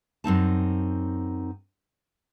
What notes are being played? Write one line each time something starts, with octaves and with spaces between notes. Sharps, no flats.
F#2 C4 D#4 A5